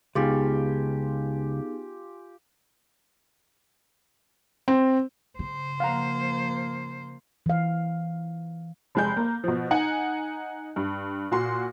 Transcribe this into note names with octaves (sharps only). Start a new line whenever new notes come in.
C#2 B3 D#4 F4 G4 G#4 G#5
C4
C#3 C5
F3 A#3 F5 F#5 A#5
E3 F5
F1 G#3 G6
A#3
B2 F3
D#4 F#5 G#5
G2
A#2 F#4 C6